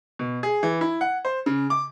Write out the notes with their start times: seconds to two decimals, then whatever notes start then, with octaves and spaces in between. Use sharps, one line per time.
0.19 B2
0.43 G#4
0.63 E3
0.81 E4
1.01 F#5
1.25 C5
1.46 C#3
1.70 D6